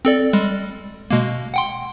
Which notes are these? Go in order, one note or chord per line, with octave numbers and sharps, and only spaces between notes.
C4 A4 D5
G3 G#3
B2 G#3 A#3
F#5 G5 C6